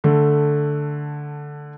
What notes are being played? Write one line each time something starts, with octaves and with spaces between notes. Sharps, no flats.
D3 A3